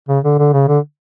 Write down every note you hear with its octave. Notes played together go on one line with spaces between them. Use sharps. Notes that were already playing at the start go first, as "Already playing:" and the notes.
C#3
D3
D3
C#3
D3